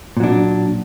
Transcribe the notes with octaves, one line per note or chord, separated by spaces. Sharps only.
A#2 F#3 D4